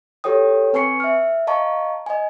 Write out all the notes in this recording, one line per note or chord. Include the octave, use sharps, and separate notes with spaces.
G4 A4 C#5 G5 D#6
C4 B4 G#5 C#6 C7 C#7
E5 F6
D#5 F5 A5 A#5 C#6
D#5 G#5